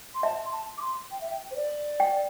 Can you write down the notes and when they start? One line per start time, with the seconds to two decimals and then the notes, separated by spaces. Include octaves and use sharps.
0.15 C6
0.23 E5 A5
0.45 C6
0.52 A5
0.78 D6
0.82 C6
1.11 G5
1.21 E5
1.30 G5
1.51 C5
1.56 D5
2.00 G5